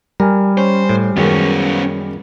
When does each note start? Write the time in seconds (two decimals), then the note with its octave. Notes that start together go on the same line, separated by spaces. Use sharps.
0.20 G3 A#4 G#5
0.58 C#4 C5
0.89 A2
1.17 F#2 D#3 G#3 B3 C#4